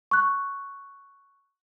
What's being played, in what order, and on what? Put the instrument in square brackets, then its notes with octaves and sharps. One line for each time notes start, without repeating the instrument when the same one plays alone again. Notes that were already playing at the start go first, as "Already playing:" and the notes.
[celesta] C#6 F#6